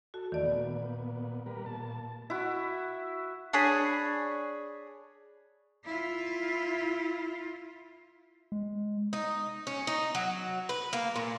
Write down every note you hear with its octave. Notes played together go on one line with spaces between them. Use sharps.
F#4 A4
D#2 D#3 E3 A3 D5
A#2 B3
G3 A#4 B4
A#2 A5
E4 F#4
D4 G#4 C#5 B5
E4 F4
G#3
D#4
C#4
D#4
F#3
B4
A#3
A#2